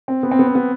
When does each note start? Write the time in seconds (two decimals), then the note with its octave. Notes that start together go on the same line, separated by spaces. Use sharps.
0.08 C4
0.23 B3
0.31 C4
0.39 B3
0.47 C4
0.55 B3